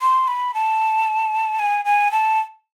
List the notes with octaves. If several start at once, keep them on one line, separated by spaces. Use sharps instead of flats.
C6
B5
A5
G#5
G#5
A5